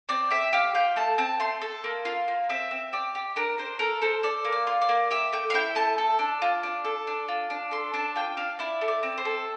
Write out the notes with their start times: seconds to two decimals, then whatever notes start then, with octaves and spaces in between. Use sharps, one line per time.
0.09 C4 D5
0.30 G4 E5
0.53 G4 F5
0.75 F4 G5
0.96 A3 A5
1.18 C4 A5
1.40 A3 C6
1.62 A4
1.84 A#3
2.05 F4
2.28 A#3
2.49 C4 E5
2.71 C4
2.93 G4 D5
3.15 G4
3.36 D4 A#4
3.58 D4 C5
3.79 A4 A#4
4.02 A4 C5
4.23 A4 D5
4.45 A#3
4.52 D5
4.67 F4
4.82 D5
4.89 A#3
5.11 G4 E5
5.33 A3 G5
5.50 F5
5.54 E4 G5
5.75 A3 A5
5.98 A4
6.19 D4
6.42 F4
6.63 D4
6.84 A4
7.07 D4
7.28 F4
7.50 D4
7.71 A4 C6
7.94 D4 A5
8.16 F4 G5
8.37 D4 F5
8.59 E4 D5
8.81 A3
8.88 D5
9.03 C4
9.18 C5
9.25 A4